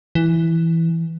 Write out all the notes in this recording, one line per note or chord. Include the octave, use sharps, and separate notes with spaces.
E3